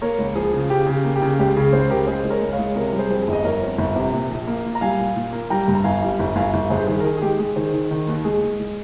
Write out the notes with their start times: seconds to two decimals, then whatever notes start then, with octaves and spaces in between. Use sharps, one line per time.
0.02 A#3 A#4 C#5
0.19 C#2
0.35 F3 G#4
0.53 C#3
0.70 C#3 G4
0.87 C#3
0.93 G4
1.05 A#3
1.16 G4
1.22 C#3
1.39 C#2 G4
1.56 C#3 G#4
1.72 C#2 G#4 C5
1.90 C#3 G4 A#4
2.07 G#3 G#4 C5
2.24 G#3
2.30 A#4 C#5
2.42 C#2
2.53 C#5 F5
2.59 G#3
2.75 C3 A#4 C#5
2.93 G3
2.99 G#4 C5
3.10 F2
3.22 G#4
3.28 G1 D#5
3.44 G1 A#4 C#5
3.61 F2
3.78 G1
3.96 C3
4.13 A#2
4.31 A#1
4.47 A#3
4.65 A#2
4.75 A#5
4.81 G3 F5 G#5
5.00 A#2
5.16 A#2
5.33 A#3
5.50 G3 G5 A#5
5.68 G2
5.75 A#5
5.84 G1 F5 G#5
6.02 G3
6.19 G1
6.36 G1 F5 G#5
6.54 G1
6.70 G2 G#4 C5
6.87 D#3 G#4
7.00 A#4
7.04 D#3 G#4
7.17 G#4
7.22 G#3 G4
7.39 G#3 G#4
7.56 D#3 G#4 C5
7.74 D#3
7.91 D#3
8.07 D#2
8.24 G#3 G#4
8.42 G#3
8.60 G#3